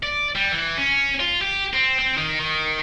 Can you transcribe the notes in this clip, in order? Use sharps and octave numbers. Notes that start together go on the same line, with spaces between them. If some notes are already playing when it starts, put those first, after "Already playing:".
D5
G3
E3
C#4
F4
G4
C4
C4
D#3
D#3